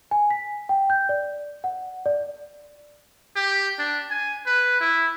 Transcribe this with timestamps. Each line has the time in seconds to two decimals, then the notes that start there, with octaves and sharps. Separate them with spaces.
0.11 G#5
0.31 B6
0.69 G5
0.90 G6
1.09 D5
1.64 F#5
2.06 D5
3.36 G4
3.79 D4
4.10 G#5
4.46 B4
4.81 E4